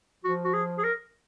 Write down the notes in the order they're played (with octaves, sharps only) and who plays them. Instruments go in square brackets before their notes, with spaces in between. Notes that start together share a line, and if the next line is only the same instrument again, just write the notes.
[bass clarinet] F3 [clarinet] F#4
[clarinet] F#4
G#4
G#4
A#4